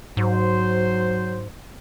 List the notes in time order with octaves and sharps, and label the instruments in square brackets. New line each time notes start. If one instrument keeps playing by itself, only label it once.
[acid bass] G#2 [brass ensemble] F#3 C5